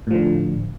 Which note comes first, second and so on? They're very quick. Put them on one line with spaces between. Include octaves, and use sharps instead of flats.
A2 F3 D3